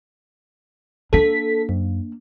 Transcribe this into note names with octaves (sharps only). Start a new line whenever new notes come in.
A#3 D4 A4 B6
F#2